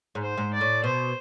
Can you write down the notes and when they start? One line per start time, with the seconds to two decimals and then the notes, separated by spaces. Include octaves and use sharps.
0.15 G#2
0.22 C5
0.37 G#2
0.54 D5
0.61 A2
0.84 B2 C5